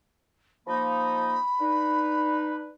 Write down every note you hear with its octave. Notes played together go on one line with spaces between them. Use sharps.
F3 A#3 D#4 B5
D4 D#4 B4